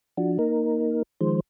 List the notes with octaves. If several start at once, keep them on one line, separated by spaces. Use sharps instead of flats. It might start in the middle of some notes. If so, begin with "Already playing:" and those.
F3 D4 F#4
A#3 D#4 A#4
D#3 F3 G#3 C5